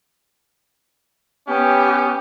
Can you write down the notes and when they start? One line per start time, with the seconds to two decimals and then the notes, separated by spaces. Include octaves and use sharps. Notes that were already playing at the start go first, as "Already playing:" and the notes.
1.48 B3 C#4 G4